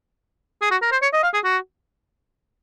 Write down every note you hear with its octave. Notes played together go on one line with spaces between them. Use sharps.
G#4
F#4
A#4
C5
C#5
D#5
F5
G#4
F#4